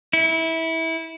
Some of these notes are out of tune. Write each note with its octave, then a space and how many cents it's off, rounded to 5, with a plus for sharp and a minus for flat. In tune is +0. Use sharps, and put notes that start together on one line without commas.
E4 -20